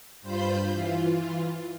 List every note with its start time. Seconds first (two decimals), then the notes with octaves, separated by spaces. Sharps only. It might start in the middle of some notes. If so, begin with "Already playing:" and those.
0.22 G2 F4 C5 B5 G6
0.70 E3 F4